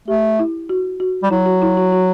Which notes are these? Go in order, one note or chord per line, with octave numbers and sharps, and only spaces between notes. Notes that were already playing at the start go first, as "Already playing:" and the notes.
A3 G4
E4
F#4
F#4
G3
F#3 E4
F#4
E4
F#4
F#4